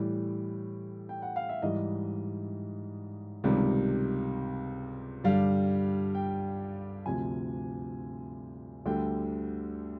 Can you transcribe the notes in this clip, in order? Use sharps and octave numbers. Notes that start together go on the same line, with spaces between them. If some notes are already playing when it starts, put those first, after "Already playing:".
Already playing: A2 E3 G3
G5
F#5
F5
E5
G#2 E3 G3 D#5
C#2 C3 D#3 G3
G2 D3 G3 F5
G5
D2 C3 F3 G#5
D2 D3 G3 G5